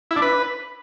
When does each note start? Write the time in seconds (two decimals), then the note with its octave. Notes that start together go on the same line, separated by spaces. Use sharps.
0.11 E4
0.16 D4
0.22 B4